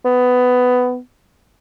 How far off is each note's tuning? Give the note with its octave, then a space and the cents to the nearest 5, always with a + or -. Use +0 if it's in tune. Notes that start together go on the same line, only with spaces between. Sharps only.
B3 +15